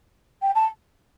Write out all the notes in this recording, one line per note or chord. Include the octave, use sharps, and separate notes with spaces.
G5
A5